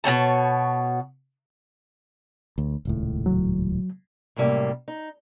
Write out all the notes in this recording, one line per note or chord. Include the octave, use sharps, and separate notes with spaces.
B2 C#4 C#5 A5
D2
D#1 C#2 A2
F#3
F#2 A2 C3 G3 A#3
D#4